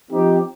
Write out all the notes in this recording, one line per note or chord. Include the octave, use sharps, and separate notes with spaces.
F3 C4 D#4 G4